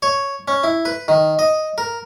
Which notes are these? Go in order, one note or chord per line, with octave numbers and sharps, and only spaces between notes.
C#5
C#4
E4
B4
D#3
D#5
A#4